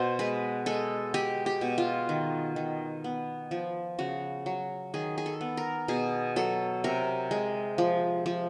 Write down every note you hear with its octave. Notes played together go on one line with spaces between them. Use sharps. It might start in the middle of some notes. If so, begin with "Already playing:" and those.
Already playing: B2 C5
G#3 B4
G#3 A4
G#3 G4
G4
B2
F4
D#3
D#3
B3
F3
C#3 F#4
F#3
D#3 G#4
G#4
A4
B3
A#4
B2 G#4
F#3 A4
C3 A#4
G#3
F3
F3